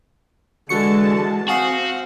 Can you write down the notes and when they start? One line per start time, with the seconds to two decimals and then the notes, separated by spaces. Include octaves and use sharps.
0.69 D3 E3 G#3 F#4 A5 C#6 C#7
1.49 C4 F#4 F5 G#5 D#6 C7